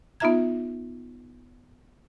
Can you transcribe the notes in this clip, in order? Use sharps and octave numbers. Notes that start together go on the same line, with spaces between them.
B3 D#4 F4 E5 A#5 G#6